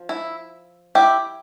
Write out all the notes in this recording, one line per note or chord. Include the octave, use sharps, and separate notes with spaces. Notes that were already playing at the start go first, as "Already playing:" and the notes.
Already playing: F3
E4
E4 G4